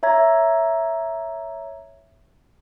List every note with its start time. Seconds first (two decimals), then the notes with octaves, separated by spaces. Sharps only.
0.03 C#5 E5 A#5 G#6